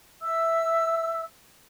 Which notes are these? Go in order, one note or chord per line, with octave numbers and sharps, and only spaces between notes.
E5 E6